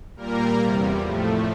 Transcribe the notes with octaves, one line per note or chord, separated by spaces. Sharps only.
A#2 G3 A#3 A#4
E2 C3 G3
A2 F3 A3